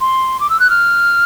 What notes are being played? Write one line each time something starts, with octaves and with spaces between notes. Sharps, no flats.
C6
D6
E6
F#6
F6